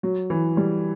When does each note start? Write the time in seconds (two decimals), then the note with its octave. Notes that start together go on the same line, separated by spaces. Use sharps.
0.03 F#3
0.30 E3
0.57 G3